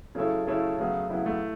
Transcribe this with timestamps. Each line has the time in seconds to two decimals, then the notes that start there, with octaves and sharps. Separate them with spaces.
0.15 C#3 F#3 A3 E4 A4 C#5
0.47 C#3 A3 E4 A4 C#5
0.79 C#3 F#3 A3 B3
1.10 C#3 F#3 B3 E4
1.26 A3